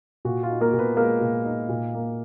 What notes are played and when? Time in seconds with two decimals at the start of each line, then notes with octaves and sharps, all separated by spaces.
0.25 A#2 F#4
0.43 F4
0.49 D#4
0.61 A#3 A#4
0.73 A#2
0.78 B3 B4
0.97 G#3 A#3 A#4
1.21 A#2
1.45 D#4
1.69 A#2
1.94 A#3